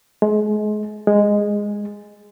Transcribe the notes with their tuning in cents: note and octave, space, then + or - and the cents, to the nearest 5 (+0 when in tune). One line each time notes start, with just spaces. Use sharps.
G#3 +30
G#3 -10